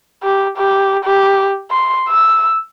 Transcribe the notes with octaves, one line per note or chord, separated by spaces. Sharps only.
G4
G4
G4
C6
E6